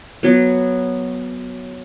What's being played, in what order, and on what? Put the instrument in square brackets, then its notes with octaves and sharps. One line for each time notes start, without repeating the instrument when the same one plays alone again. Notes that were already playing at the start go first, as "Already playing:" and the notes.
[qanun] F#3 B3